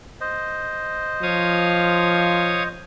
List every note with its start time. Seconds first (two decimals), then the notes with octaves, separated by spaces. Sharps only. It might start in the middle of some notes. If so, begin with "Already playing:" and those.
0.21 C5 D#5
1.23 F3 C#5 F5 D#6